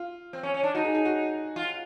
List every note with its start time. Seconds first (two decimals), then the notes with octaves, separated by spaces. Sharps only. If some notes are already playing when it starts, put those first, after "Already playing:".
Already playing: F4
0.33 C4
0.43 C#4
0.54 C#4
0.63 D4
0.74 D#4 F#4
0.84 G#4
0.94 G#4
1.05 F#4
1.56 F4